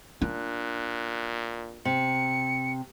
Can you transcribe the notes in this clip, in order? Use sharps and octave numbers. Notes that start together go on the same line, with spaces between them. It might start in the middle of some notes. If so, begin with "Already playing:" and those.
A#2 D4 F#6
C3 C#7